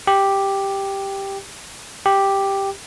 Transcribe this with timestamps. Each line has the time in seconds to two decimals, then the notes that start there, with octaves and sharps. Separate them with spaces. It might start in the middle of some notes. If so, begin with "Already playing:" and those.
0.07 G4
2.06 G4